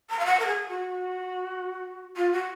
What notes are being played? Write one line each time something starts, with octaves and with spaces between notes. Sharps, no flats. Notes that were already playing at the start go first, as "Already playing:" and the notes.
A#5
F5
F#5
A#4
G#4
F#4
F4
F#4